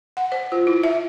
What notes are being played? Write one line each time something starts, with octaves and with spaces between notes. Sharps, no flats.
F#5
C5
F4
E4
E5